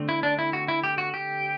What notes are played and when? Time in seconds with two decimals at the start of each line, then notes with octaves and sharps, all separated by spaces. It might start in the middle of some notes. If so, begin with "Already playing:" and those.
Already playing: D3 A3 C4
0.09 E4
0.23 D4
0.39 E4
0.53 F#4
0.68 E4
0.84 G4
0.98 F#4
1.14 G4